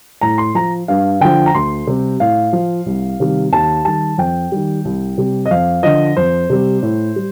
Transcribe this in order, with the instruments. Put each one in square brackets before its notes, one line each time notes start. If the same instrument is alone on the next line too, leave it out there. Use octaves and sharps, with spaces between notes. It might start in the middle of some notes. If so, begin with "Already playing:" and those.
[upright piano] A2 A#5
C6
F3 A#5
G2 F5
D3 F3 G5
A#5
D2 C6
C3 G3
A2 F5
F3
C2
C3 D#3 G3
D#2 A5
D#3 G3 A5
F2 G5
D#3 G3
C2
C3 G3
D#5
F2 F5
D3 F3 D#5
F2 C5
C3 G3
A2
G3